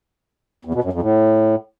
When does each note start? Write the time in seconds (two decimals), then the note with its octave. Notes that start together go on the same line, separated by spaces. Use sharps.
0.65 E2
0.74 B2
0.84 F#2
0.93 F2
1.02 A2